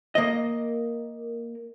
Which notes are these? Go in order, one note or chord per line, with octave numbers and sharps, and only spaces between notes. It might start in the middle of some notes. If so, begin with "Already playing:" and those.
A#3 D#5